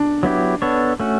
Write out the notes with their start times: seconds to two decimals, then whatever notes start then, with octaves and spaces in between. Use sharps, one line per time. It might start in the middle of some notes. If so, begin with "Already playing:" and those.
Already playing: D4
0.23 F#3 B3 E4 G4
0.62 B3 D4 A4 C#5
1.00 A3 C#4 F#4